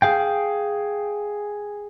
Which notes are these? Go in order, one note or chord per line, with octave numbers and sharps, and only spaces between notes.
G#4 F5 G5